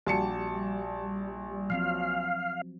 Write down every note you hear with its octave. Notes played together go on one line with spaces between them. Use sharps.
A#1 G3 F#4 G4 A5 C#7
F3 F#3 C4 F5